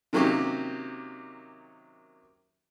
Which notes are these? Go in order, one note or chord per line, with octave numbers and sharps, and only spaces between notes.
C3 D#3 F#3 A#3 C#4 G4